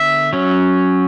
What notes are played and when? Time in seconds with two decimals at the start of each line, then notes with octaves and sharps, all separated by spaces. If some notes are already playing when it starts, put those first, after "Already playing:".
Already playing: D3 B3 E5
0.33 F#3 C#4